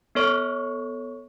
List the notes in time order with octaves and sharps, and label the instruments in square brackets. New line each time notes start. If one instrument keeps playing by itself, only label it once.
[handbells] B3 A4 C#5 C#6